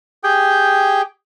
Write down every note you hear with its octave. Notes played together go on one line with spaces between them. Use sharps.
G4 G#4 G5